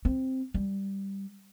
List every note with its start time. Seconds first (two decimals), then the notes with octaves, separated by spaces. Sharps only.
0.05 C4
0.54 G3